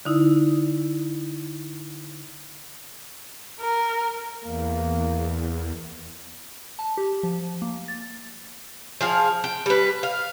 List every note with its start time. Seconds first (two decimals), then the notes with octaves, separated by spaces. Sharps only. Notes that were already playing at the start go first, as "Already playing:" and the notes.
0.05 D3 D#4 E4
3.60 A#4
4.45 E2 A#3
6.79 A5
6.97 G4
7.23 F3
7.62 A#3
7.88 A6
9.01 F3 G#4 F5
9.44 G5
9.66 G3 B4
10.03 F5